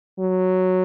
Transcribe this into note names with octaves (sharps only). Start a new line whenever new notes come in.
F#3